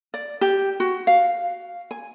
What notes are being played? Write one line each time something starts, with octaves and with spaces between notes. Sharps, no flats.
D5
G4
F#4
F5
G#5